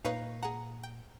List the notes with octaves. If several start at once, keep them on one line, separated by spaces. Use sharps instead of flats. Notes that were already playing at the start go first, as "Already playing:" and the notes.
A#2 D#4 A#4 B4 C#5 F5
G#4 F#5 A#5
G5